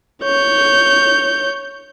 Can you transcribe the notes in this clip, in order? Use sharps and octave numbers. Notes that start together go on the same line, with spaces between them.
C#5 G6